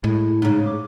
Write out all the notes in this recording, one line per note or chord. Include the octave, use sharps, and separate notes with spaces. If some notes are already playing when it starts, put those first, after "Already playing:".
A2 G#3 E4
G#2 C#3 D#4
D6